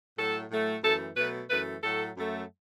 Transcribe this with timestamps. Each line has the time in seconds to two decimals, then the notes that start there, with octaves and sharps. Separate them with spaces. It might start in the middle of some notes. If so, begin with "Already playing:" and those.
0.17 A2 F#3 A3 A4
0.51 A2 F#3 A3
0.83 F#2 E3 A3 A4
1.17 B2 F#3 A3 B4
1.50 F#2 E3 A3 B4
1.83 A2 F#3 A3 A4
2.16 F#2 F#3 A3